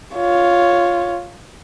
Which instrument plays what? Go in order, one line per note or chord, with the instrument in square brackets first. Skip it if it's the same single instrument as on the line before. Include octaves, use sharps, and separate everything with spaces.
[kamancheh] F4 C#5